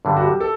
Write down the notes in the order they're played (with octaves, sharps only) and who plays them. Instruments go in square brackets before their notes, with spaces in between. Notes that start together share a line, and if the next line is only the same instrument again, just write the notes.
[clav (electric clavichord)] G2 D3 G3
[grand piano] F#4
G4
A4